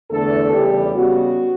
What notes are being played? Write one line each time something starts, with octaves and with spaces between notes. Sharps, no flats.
E2 D3 A3 A4
E2 C#3 G3 G4
C#3 G3 B3 F#4